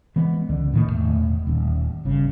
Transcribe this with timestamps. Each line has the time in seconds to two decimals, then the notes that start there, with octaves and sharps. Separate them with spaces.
0.16 E3 F3 G#3 B3
0.49 C#2 D3
0.74 A2 D#3 A#3
0.86 E1 E2 A3
1.47 D#1 D#2
2.05 G1 C#3